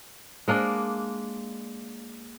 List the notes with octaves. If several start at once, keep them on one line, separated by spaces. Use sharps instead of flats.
G#3 A#3 D4 D5